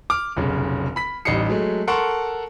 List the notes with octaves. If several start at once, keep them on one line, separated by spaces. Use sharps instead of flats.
D6 F6
F1 B1 C#3
B5 B6
A1 G3 D#4 C7 C#7
F#3 G#3 A3
A4 A#4 F#5 A5 C6 C#6